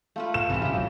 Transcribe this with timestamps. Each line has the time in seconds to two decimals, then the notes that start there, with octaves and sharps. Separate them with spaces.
0.16 A3 F4 B4 F5
0.34 E7
0.50 B1 G#2 C3 E3 F4 G4
0.62 G#2 C#3 G#4 F5 G5
0.74 D#1 A2 F#3